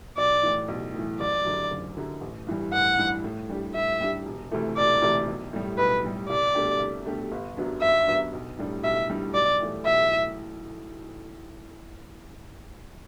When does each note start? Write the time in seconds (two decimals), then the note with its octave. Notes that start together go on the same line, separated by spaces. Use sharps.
0.17 B1 D5
0.43 A2 E3
0.68 B1
0.94 A2 E3
1.20 F#1 D5
1.45 F#2 D3
1.71 F#1
1.97 F#2 D3
2.21 A1
2.47 G2 E3 G3
2.73 A1 F#5
2.98 G2 E3 G3
3.24 A2
3.49 G3 D4 G4
3.74 A2 E5
4.01 G3 D4 G4
4.25 E1
4.51 D2 C3 E3 A3
4.76 E1 D5
5.02 D2 C3 E3 A3
5.27 B1
5.53 A2 G3
5.78 B1 B4
6.04 A2 G3
6.28 C2 D5
6.55 B2 A3 D4 G4
6.80 C2
7.06 B2 A3 D4 G4
7.32 G1
7.57 F#2 F#3 B3 D4
7.81 G1 E5
8.07 F#2 F#3 B3 D4
8.33 B1
8.58 A2 G3 D4
8.84 B1 E5
9.10 A2 G3 D4
9.34 B1 D5
9.60 A2 E3 A3
9.86 B1 E5
10.10 A2